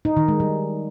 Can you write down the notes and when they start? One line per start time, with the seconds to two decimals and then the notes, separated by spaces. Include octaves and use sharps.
0.05 D#4
0.17 D#3
0.28 G#3
0.40 G3